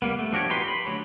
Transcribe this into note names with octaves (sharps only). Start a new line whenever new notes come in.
G3 A#3 B3
A3
F3 D4 F#4 G4 C#5
D#4 G4 B4 C6
B5
D3 F#3 A3 G4 C#5